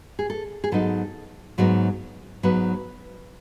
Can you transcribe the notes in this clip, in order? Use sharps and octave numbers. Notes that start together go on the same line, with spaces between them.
G#4
A4
G#4
G#2 F#3 B3 D#4 A4
G#2 F#3 B3 D#4
G#2 F#3 B3 D#4 B4